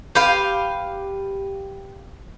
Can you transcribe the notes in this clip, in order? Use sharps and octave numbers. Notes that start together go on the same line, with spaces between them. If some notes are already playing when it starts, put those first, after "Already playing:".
G4 B4 F5